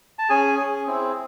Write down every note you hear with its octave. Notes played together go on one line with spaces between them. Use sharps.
A5
C#4 G#4 G#5
C#4 G#4
C4 E4 G#4